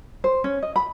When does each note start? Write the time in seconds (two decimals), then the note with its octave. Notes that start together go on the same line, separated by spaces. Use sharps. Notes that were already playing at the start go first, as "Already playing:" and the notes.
0.24 C5
0.44 C#4
0.63 D#5
0.76 B5